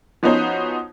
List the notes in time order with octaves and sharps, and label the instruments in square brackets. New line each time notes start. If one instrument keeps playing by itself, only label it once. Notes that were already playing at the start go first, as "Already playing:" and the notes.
[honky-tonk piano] F3 B3 C#4 D#4 F#4 C5